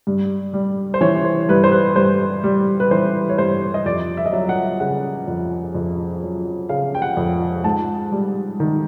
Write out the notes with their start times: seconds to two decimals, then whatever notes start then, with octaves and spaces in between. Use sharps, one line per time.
0.07 G2
0.53 G3
0.94 C5
1.01 E3 C#5
1.25 C5
1.49 G2 B4
1.64 C5
1.72 B4
1.96 G2 C5
2.44 G3
2.80 B4
2.91 E3 C5
3.29 C#5
3.38 G2 C5
3.74 D#5
3.86 F2 D5
4.17 E5
4.26 D#5
4.32 F#3 E5
4.49 F#5
4.80 C#3 F#5
5.28 F2
5.75 F2
6.23 F#3
6.69 C#3 F5
6.95 G5
7.02 F#5
7.17 F2
7.64 G#2 A5
8.12 G3
8.60 D#3